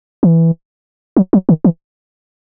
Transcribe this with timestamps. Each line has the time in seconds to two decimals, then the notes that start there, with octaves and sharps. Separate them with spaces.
0.23 E3
1.17 F#3
1.33 F#3
1.49 D#3
1.65 E3